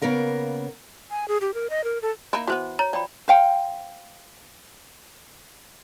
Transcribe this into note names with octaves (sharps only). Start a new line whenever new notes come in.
C#3 A#3 B3 A#4 F5
G#5
G#4
G4
A#4
D#5
A#4
A4
A#3 D#4 E4
E3 A3 B3 F#4 B4 C5
C#5 A#5
F3 D5 G5 B5
C5 F5 G5